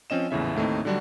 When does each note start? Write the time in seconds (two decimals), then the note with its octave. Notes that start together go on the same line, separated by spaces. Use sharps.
0.10 F3 C4 C#4 D#5 E7
0.31 A#1 E2 A2 C#3 E5
0.55 D#2 A2 A3 C4 D#4
0.85 D3 F#3 G3 D4 F#4